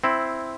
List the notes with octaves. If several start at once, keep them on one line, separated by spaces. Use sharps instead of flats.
C4 E4